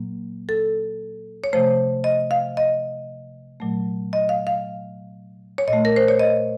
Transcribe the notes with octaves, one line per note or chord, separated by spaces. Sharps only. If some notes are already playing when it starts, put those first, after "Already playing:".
Already playing: A#2 F#3 A#3
A4
C#5
C3 F3 A3 C5
D#5
F5
D#5
A#2 F#3 A3
D#5
F5
F5
C#5
A#2 D#5
A3
A#4
C5
C#5
D#5